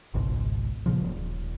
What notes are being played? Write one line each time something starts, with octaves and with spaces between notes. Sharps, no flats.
G#1 C#2 G#2 B2
G2 A#2 C#3 F3
D#1